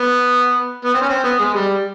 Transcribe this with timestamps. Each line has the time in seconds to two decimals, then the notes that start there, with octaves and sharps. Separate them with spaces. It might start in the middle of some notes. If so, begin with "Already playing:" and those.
Already playing: B3
0.84 B3
0.94 C4
1.02 C#4
1.09 C4
1.24 B3
1.39 G#3
1.54 G3